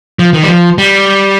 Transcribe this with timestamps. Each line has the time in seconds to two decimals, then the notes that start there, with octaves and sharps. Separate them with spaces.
0.19 F3
0.33 D#3
0.42 G3
0.48 F3
0.78 G3